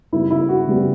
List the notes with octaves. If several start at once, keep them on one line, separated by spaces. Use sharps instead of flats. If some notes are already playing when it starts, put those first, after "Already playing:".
C#3 G3 B3 E4
E4
F#4
C#3 G3 B3